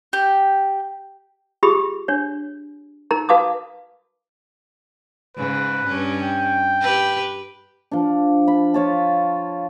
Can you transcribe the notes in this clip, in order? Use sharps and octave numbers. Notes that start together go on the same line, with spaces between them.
G4
F4 G4 G#4 B5 D#6
D4 C#5
D#4 A#4 A#5
F#4 B4 F5 A5 D6 D#6
G#2 C#3 B4
G2 C#4
G5
G4 B4
F3 D4
B5
F4 C#5 A5